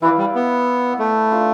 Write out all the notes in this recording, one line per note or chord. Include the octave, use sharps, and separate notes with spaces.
E3 E4 B4 D5 F5
G3
B3
A3
D4 F4 A4 D5